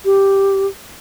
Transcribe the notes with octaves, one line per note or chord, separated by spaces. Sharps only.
G4